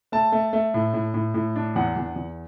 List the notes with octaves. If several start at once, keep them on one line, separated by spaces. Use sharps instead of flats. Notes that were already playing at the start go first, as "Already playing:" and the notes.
A3 A5
A3
A3
A2
A2
A2
A2
D4
E2 F#5
E2
E2